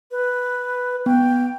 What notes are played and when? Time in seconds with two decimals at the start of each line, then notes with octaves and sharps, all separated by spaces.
0.11 B4
1.06 B3 G5